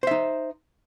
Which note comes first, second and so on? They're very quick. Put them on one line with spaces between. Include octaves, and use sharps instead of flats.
C5 E5 D#4